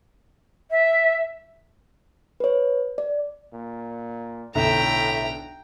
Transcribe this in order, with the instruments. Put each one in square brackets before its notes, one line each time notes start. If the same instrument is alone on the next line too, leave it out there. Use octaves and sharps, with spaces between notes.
[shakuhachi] E5
[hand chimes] B4 C#5
D5
[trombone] A#2
[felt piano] B1 D3 [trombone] A2 [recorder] E5 [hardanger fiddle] G5 A#5